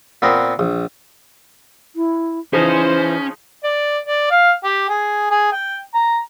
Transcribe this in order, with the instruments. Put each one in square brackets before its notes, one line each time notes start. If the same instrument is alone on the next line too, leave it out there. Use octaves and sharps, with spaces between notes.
[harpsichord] A#2 B3 C4 A#4
A#1
[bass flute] E4
[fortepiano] C#3 F3 D#4 [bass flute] E3 [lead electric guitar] C#4 [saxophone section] C5
[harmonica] D5
D5
F5
G4
G#4
G#4
G5
A#5